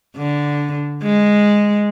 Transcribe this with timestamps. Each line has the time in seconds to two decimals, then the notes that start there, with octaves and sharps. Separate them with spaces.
0.16 D3
1.03 G#3